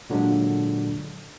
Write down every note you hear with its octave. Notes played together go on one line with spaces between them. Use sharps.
A#2 D3 F#3 G#3 D4